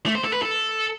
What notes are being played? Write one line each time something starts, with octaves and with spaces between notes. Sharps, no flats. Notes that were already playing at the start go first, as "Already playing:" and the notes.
A3
C5
A4
B4
A4